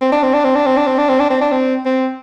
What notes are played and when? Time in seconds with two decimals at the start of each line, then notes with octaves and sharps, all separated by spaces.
0.01 C4
0.12 D4
0.23 C4
0.33 D4
0.44 C4
0.55 D4
0.66 C4
0.77 D4
0.87 C4
0.98 D4
1.09 C4
1.20 D4
1.30 C4
1.41 D4
1.51 C4
1.85 C4